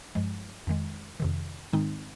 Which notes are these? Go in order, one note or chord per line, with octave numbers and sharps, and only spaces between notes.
G2 F3 G#3
F2 D#3 G#3
F2 C3 D#3
G#2 D#3 G#3 C4 D#4